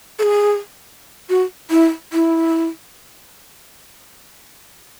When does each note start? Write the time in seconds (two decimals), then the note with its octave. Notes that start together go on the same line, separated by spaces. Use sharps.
0.19 A4
0.23 G#4
1.29 F#4
1.71 E4
2.13 E4